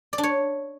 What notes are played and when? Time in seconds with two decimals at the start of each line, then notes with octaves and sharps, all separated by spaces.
0.13 D5
0.18 D4
0.23 C#5